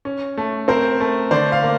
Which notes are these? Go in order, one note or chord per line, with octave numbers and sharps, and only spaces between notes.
C#4
A3
C4 A#4 C5
A3
D3 C5 D5
F5
A#3